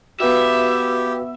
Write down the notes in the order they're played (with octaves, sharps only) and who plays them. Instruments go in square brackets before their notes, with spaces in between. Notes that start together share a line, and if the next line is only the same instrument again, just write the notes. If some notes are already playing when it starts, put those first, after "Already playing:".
[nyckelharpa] B3 [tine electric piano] F#4 B4 F5 [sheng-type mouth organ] G4 [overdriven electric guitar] E5